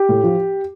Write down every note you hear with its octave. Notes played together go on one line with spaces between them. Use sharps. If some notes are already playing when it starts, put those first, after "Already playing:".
Already playing: G4
A2
F3